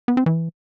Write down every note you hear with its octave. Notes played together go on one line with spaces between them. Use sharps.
B3
C4
E3